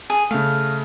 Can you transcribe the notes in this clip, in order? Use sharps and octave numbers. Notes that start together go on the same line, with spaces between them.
G#4
C#3 A3 F5